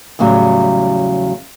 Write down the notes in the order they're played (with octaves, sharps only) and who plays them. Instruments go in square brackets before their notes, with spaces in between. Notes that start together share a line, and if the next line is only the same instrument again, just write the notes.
[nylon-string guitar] E2 A2 C#3 F#3 G3